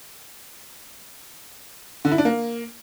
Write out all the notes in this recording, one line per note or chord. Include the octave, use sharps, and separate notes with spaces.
D3
E4
D4
A#3